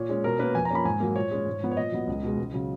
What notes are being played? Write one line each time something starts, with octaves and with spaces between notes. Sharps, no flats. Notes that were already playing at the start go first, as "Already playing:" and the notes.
Already playing: A#2 C#5
G#3 C#4
B2 A#4
A#3 C#4 B4
F2 G#5
A#5
F3 A#3 C#4 B5
G#2 G#5
F#3 A#3
A#2 C#5
G#3 C#4
G#2
F3 B3
C#5
A#2 D#5
F#3 B3
C#2
B2 G#3
C#2
C#3 F#3